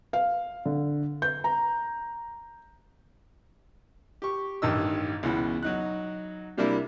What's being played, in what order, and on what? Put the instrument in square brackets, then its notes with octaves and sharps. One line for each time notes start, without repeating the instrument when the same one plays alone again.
[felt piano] F5
D3
G6
A#5
[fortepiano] G4 C#6
A1 G2 D#3 D#5 E6
C#2 B2 E3
F#3 D#4 F#6
C3 G3 A#3 D4 E4